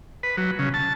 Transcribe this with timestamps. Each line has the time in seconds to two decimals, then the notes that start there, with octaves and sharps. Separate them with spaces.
0.23 B4
0.37 F#3
0.59 C#3
0.74 A5